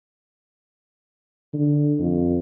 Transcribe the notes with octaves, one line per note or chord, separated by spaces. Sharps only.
D3
F2